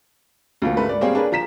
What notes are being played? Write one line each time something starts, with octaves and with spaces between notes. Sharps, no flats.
D2 F3 A#3
G#2 A3 A#4 B4
D5
G3 A#3 C4 C#4 G#4
D4 G#4 A#4 B4
F3 A#5 B6 E7